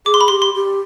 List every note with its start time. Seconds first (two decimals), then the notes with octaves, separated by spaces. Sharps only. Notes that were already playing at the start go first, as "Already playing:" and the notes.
0.06 G#4 D6
0.14 C6
0.21 B5
0.28 G4 C6
0.42 C6
0.54 G4